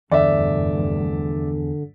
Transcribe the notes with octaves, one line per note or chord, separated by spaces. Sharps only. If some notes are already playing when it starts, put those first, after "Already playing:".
F1 E2 G2 D3 D5 E5